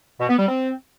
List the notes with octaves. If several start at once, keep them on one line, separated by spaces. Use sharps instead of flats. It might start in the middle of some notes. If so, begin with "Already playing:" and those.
B2
B3
G3
C4